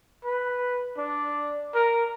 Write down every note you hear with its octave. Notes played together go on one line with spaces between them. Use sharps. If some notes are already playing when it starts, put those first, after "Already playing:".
B4
D4
A#4